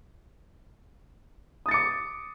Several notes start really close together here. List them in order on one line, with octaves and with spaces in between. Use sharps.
D#6 A6 C#7 D6